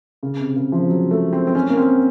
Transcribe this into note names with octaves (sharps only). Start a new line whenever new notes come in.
C#3
C3
C#3
F3
F#3
A3
C4
C4
C#4
A#3
C4